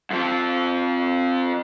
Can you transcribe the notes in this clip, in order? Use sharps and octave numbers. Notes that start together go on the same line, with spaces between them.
F2 F3